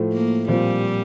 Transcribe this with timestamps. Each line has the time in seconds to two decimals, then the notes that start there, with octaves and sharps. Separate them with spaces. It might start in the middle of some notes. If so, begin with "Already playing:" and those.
Already playing: A2 F3 A3
0.13 A#3
0.48 A#2 F3 G3 C4 F4